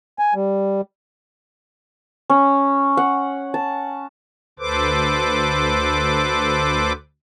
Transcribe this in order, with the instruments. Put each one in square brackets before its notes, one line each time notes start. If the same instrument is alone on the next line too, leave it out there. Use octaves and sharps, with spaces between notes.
[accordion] G#5
G3
[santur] C#4
F#5
A5
[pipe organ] D2 A4 B4 C5 D6